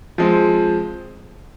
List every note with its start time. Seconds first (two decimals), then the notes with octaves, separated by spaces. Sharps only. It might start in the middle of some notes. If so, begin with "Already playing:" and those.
0.18 F3 G#3 C4